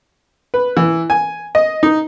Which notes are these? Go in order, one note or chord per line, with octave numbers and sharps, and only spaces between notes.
B4
E3
G#5
D#5
D#4